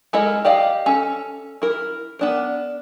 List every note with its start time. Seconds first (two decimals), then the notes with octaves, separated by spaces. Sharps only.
0.13 G#3 E4 A4 A#4 D#5
0.45 G4 D5 D#5 F5
0.86 C#4 A4
1.62 E4 A#4
2.19 B3 D4 A#4